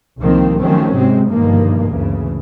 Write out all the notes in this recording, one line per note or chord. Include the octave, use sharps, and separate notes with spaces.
C2 D#3 F3 A#3 C4
D#3 F3 F#3 A3 C4 C#4
G#2 C3 G#3 C4
G1 G2 B2 D#3 F3 A#3
D2 G2 C#3 E3